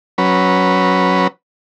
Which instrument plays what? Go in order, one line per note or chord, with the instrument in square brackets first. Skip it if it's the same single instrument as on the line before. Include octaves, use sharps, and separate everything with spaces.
[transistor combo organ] F#3 C#4 B4